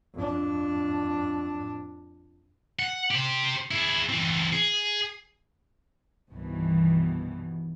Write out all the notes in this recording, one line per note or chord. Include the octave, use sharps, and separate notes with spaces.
F2 D4
F#5
G4 C5
E4 G#4
E3 C4
G#4
C2 G2 B2 D#3 E3